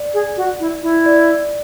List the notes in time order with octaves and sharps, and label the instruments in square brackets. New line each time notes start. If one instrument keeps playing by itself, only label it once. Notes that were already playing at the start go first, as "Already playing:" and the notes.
Already playing: [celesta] D5
[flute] G#4
F#4
E4
E4
[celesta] D5